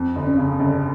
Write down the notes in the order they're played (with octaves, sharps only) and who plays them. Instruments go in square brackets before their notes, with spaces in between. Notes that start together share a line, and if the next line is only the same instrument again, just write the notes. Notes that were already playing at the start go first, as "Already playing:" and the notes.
Already playing: [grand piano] F2
G1
[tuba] C#4
[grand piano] C#3
G1